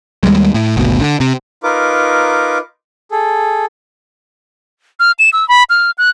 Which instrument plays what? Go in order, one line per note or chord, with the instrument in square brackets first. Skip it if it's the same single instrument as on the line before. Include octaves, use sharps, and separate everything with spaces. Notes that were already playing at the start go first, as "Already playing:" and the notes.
[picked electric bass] D#2 G3 G#3
A2
G#1 D2 B2
D3
C3
[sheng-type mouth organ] D#4 F4 A#4 B4 D6
G#4 A4
[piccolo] F6
E7
E6
B5
F6
F#6